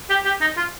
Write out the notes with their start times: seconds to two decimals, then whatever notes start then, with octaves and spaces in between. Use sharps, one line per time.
0.10 G4
0.25 G4
0.41 D#4
0.57 F4